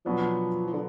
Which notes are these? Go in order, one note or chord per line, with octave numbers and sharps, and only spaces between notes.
B2 F3 F#3 B3 D4
F3
D3